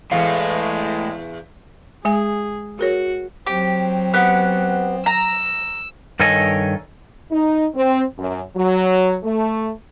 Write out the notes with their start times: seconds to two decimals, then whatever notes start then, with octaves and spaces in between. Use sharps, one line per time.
0.12 E2 A2 G#3 F5
2.05 G#3 G#4 G#5
2.79 F#4 G#4 A#4 C#5
3.47 F#3 C4 G4
4.14 B3 G4 F#5
5.06 A#5 E6
6.20 G2 D#3 A4 C#5 D#5 G#5
7.32 D#4
7.75 C4
8.17 F#2
8.56 F#3
9.23 A3